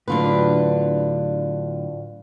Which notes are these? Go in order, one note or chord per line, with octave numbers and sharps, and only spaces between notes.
A2 D3 F#3 D4 F4 B4